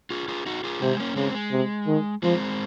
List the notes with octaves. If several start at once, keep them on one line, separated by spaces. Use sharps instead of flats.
F4 G#4
F4 G#4
D#4 F#4
F4 G#4
C3 G#3 C4
A#3 C#4
C#3 G#3 C4
G#3
C3
D#3
F3 G#3 C4